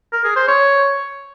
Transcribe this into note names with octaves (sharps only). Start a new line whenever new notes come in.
A#4
G#4
C5
C#5